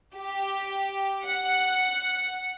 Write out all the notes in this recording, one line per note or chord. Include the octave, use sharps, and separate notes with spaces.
G4
F#5